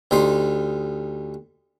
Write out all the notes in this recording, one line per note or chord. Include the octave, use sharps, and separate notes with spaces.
D2 G3 D#4 C6